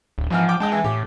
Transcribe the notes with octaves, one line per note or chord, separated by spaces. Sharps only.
D1
G#1 E3 F3 F6
G5 D6
G#3 D#5 G5 A5
E3
A2 G4